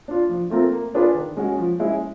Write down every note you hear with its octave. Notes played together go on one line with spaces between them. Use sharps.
D4 F4
F3
A3 C4 F4 A#4
A#3
D4 F4 G#4 B4
D#3
G#3 C#4 F#4
F3
G#3 C#4 E4